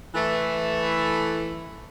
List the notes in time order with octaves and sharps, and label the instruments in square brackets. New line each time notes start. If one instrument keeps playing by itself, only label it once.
[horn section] E3 A3